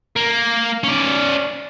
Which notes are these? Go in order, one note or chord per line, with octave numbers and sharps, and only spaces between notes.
A#3
C#4 D5